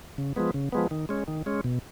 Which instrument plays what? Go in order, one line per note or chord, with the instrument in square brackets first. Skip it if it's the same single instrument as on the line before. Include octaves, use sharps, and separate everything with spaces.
[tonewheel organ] C#3
F3 G#3 B3
C#3
F3 G#3 B3
D#3
G#3 C#4
D#3
G#3 C#4
B2